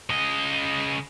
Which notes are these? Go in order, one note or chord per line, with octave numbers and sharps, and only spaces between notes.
C#3 D#5